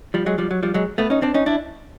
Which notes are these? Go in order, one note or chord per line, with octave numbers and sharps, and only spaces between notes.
F3 G3
F#3 G#3
F3 G3
F#3
F3 G3
F#3 G#3
A3 B3
C#4 D#4
C4 D4
C#4 D#4
D4 E4